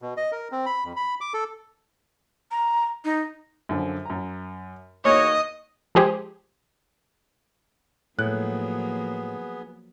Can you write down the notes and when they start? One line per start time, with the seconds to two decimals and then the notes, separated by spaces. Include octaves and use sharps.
0.02 B2
0.17 D#5
0.32 A#4
0.52 C4
0.66 B5
0.84 F2
0.96 B5
1.21 D6
1.34 A4
2.51 A#5
3.05 D#4
3.69 F#2 D3 F3
4.05 F#2 A#5
5.05 E2 A#3 D#4 F#4 C#5 D#5
5.95 F3 G#3 G4 G#4 C5
8.19 A2 F3 F#3 A#3 B3 G#4 F#6